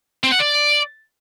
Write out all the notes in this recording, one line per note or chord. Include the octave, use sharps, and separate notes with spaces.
C4
F#5
D5